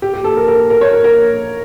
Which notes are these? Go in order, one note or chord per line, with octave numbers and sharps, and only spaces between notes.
G4
G4
A4
A#4
A#4
A#4
C#5
A#4
A#4